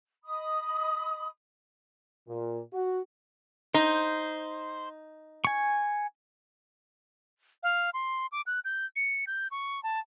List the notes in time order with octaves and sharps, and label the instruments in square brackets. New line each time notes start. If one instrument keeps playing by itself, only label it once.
[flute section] D#5 B5 D#6
[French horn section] A#2
F#4
[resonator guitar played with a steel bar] D#4 [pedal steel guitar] C5
[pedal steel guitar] G#5 C#6
[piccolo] F5
C6
D6
F#6
G6
C#7
G6
C#6
A5